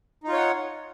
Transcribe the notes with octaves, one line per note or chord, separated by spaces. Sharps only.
D#4 F4 C#5 F#5